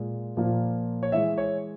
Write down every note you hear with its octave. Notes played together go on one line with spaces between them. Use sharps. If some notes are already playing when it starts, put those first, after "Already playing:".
Already playing: A#2 G#3
A#2 F3 A#3
C#5
E3 G#3 E5
C#5